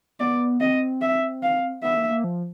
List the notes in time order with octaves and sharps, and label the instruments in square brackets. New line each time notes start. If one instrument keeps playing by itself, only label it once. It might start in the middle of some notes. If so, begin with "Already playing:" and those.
[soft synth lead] B3 [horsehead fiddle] D5
[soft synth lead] C4 [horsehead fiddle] D#5
[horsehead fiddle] E5
F5
[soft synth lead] B3 [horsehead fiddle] E5
[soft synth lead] A#3
A#3
F3